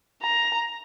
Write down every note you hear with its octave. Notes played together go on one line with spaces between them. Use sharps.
A#5